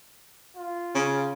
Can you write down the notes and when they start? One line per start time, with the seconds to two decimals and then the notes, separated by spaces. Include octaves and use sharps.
0.57 F4
0.95 C#3